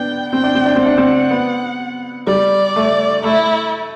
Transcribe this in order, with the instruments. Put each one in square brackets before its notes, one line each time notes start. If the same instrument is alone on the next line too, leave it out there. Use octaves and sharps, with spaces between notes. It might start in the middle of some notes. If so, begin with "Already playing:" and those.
Already playing: [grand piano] B3 D4 [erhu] G5
[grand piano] C4 [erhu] G5
[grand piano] D4
C4
D4
C4
[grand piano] D4 [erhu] F#5
[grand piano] C4
B3
[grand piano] G3 [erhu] D5
[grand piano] A3
[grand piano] A3 [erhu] E4